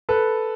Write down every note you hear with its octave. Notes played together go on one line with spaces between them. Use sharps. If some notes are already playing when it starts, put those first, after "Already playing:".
A4 B4